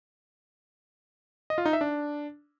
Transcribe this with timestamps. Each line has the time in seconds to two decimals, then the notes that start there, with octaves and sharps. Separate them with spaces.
1.50 D#5
1.58 F4
1.65 D#4
1.73 E5
1.81 D4